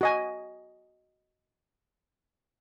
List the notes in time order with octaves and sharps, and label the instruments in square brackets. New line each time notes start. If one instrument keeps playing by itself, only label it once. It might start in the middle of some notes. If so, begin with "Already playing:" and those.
[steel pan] F#4 D#5 G#5